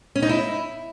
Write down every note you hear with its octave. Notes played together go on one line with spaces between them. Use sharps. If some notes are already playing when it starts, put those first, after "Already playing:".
C#4
D#4
E4